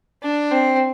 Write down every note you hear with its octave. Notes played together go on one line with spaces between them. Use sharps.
D4
C4